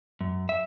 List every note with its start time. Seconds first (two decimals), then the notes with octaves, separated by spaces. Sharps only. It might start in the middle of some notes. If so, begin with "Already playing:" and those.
0.21 F#2
0.49 E5